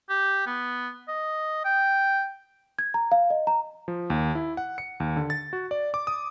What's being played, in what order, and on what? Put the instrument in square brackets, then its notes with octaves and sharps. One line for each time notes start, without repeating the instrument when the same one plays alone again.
[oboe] G4
B3
D#5
G5
[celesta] G#6
A#5
F5
D#5
A#5
[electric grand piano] F3
D#2
E4
F#5
C#7
D#2
D3
A6
F#4
D5
D6
D#6